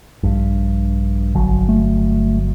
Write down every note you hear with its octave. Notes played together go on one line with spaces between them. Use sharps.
A#1 G2
G1 F#3
A3